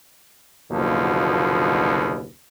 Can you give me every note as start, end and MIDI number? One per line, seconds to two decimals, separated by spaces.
0.72 2.26 30
0.72 2.26 39
0.72 2.26 47
0.72 2.26 50
0.72 2.26 53